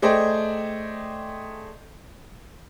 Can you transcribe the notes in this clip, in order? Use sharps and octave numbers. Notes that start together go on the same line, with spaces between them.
A3 G#4 C5 D5 D#5 G5